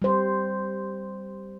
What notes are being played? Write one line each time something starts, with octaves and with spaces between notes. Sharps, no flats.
G3 C5